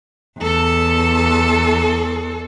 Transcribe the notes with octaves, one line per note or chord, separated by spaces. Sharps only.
E2 A4